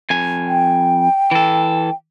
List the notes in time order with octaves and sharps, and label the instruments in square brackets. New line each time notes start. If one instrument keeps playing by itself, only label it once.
[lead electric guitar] F2 G#5
[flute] G5
[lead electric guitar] E3 A4